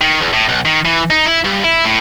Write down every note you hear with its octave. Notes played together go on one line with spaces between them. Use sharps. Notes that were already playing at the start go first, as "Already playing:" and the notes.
D#3
E2
A2
B1
D#3
E3
D#4
E4
G2
E4
A2